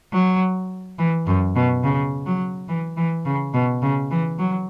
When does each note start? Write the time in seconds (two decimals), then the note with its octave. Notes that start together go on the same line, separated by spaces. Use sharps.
0.13 F#3
0.99 E3
1.27 F#2
1.55 B2
1.84 C#3
2.26 F#3
2.69 E3
2.97 E3
3.25 C#3
3.54 B2
3.82 C#3
4.11 E3
4.39 F#3